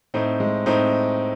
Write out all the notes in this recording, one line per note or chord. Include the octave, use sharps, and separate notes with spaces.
A2 C4 D#4
G#3
A2 C4 D#4